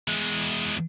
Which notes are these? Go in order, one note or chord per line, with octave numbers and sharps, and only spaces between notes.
E2 G#3